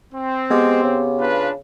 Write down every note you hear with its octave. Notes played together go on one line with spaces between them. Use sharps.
C4
G#3 B3 G4
C#3
D4 F4 B4